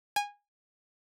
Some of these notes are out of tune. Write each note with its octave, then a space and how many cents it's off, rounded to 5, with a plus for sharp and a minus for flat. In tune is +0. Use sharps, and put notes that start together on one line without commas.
G#5 -20